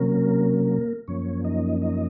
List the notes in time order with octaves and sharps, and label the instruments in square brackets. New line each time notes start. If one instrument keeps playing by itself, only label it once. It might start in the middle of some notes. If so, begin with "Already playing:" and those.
Already playing: [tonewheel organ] C3 F#3 A#3 C#4 A#4
F#2 F3 A#3 C#4 C#5
D#4 D#5
D#4 D#5